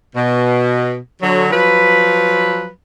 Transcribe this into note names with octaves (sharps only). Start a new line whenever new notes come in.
B2
D3 F#3
F3 F#3 B4